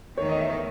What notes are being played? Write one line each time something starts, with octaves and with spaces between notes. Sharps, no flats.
E2 D#3 A3 D#4 C#5
D#5
E5
C#5